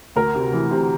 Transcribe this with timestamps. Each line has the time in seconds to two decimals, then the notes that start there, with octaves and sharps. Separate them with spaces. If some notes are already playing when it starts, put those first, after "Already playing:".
0.16 D2 A#4
0.35 C3
0.53 E3
0.71 C3